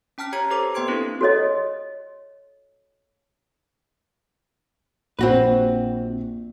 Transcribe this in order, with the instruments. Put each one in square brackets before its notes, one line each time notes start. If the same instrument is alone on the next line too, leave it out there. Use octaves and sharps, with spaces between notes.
[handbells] C#4 G5 A5 F6 B6
G4 C#5 A#5 G#6 C#7
G4 A4 B4 C5 D6
A#3 B3 G5 C6 G#6 D7
C4 D4 E4 A4 A#4
[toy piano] F#4 A4 C#5 D#5
[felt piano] A#1 [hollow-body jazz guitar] C4 F#4 B4